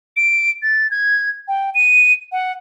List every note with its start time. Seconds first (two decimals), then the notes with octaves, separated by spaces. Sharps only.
0.16 D7
0.62 A6
0.91 G#6
1.48 G5
1.74 D#7
2.32 F#5